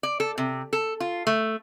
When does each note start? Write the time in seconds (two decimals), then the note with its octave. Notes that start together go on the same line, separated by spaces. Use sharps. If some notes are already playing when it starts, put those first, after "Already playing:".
0.03 D5
0.20 A4
0.38 C3
0.73 A4
1.00 F4
1.27 A3